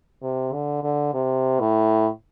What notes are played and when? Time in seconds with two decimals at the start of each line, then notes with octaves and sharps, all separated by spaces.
0.23 C3
0.53 D3
0.83 D3
1.14 C3
1.60 A2